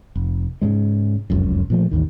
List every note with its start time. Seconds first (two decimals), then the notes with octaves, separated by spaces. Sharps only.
0.16 F1
0.61 G#2 C#3 G#3
1.30 F1 C#2 F#2
1.70 A#2 F3 A3
1.91 A1 D#2 D#3